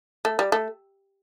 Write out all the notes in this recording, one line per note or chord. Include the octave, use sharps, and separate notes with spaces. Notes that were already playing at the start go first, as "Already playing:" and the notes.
A3
G3
A3